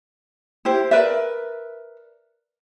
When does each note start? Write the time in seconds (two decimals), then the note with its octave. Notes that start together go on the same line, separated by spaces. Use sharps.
0.65 E4 G4 C5
0.91 A#4 B4 D5 E5